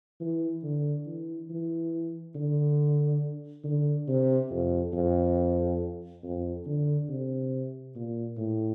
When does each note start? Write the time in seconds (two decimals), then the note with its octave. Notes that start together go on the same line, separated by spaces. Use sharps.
0.21 E3
0.63 D3
1.06 E3
1.50 E3
2.36 D3
3.64 D3
4.08 C3
4.51 F2
4.93 F2
6.23 F2
6.66 D3
7.09 C3
7.95 A#2
8.38 A2